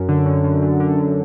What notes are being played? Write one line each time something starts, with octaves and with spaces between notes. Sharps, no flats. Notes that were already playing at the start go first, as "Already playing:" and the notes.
Already playing: F#2
D3
F#2
F#2
F#2
D3
F#2